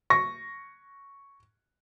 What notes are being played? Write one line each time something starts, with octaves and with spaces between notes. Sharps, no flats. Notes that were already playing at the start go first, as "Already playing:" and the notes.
C#6 A#6